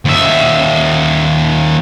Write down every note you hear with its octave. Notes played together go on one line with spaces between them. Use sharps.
D#2 E5